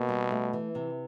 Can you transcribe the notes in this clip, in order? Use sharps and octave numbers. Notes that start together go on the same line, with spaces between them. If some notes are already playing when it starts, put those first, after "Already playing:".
Already playing: B2 A#3
G3
A3
E3
C3